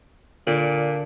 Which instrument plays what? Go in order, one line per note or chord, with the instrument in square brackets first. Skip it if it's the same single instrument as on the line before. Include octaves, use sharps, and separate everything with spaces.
[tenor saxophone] A#2 [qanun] D3 D5